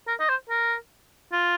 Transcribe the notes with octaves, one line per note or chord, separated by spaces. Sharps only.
A#4
D#5
C5
A#4
F4